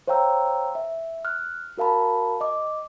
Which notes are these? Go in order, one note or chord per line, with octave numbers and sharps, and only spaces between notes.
C5 C#5 F5 G5 A#5 E6
E5
F6 F#6
F#4 A#4 F5 A5 B5
D#5 D6